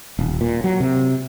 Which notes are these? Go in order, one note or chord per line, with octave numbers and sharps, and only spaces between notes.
D#1
A#2
F#3
C3